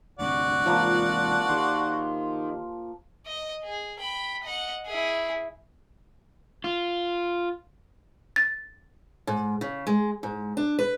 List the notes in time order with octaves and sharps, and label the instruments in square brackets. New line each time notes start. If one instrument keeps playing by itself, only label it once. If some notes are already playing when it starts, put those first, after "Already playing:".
[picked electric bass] D2 G2 C3 [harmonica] F#4 D5 F#5
[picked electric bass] E2 G#2 C3 [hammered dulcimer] F3 A#3 [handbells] F4
[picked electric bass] D#3 [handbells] G4 C6
[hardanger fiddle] D#5
G#4
G5 B5
D#5 F#5
E4 G#4
[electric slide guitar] F4
[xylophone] A6
[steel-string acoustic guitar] G#2
C#3
G#3
G#2
D4
B4